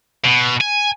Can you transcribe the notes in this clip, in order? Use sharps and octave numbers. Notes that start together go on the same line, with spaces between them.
B2
G#5